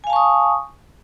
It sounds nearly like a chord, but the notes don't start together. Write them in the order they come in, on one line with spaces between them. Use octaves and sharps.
G#5 F5 A5 C#6 D#6